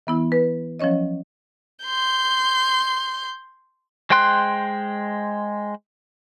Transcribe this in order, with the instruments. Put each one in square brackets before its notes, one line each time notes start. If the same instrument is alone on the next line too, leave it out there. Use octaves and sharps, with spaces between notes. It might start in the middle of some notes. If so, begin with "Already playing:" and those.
[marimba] E3 B3 E4
B4
F3 F#3 C#4 C#5 D#5
[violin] C6 G6
[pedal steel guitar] G#3 C5 G5 C6 F#6